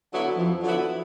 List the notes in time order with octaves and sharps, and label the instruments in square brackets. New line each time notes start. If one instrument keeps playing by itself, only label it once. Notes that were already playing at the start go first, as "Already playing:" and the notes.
[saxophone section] D3 F#3 B3 E4
[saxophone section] F2 [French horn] F3
[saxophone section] D3 F#3 B3 E4